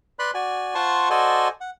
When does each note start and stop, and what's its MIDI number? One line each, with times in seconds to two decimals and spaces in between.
0.19 0.31 71
0.19 0.31 74
0.19 0.31 83
0.19 0.31 84
0.19 0.31 90
0.34 0.75 66
0.34 0.75 74
0.34 0.75 80
0.75 1.09 65
0.75 1.09 72
0.75 1.09 78
0.75 1.09 81
0.75 1.09 84
0.75 1.09 85
1.10 1.48 66
1.10 1.48 69
1.10 1.48 72
1.10 1.48 74
1.10 1.48 75
1.10 1.48 80
1.61 1.70 78